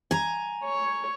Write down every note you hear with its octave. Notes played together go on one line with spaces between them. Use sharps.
G#5 A#5
C#5